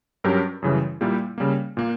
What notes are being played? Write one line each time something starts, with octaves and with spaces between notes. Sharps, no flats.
G2 F#3 C#4 G4 A#4
F#2 C#3 E3 G3
A#2 G3 A#3 E4 G4
C#3 G3 A#3
A#2 A#3